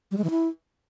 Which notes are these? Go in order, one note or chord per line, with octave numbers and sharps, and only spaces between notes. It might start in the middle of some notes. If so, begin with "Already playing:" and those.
G3
G#3
E3
E4